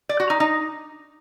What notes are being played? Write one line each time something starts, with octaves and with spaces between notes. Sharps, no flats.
D5
F#4
D#4
D#4